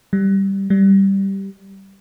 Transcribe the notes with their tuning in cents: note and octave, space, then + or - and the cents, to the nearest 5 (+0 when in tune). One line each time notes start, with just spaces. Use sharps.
G3 -5
G3 -5